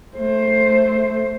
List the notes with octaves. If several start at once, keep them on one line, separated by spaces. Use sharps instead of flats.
A3 C5